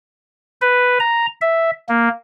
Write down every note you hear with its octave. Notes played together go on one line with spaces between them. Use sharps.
B4
A#5
E5
A#3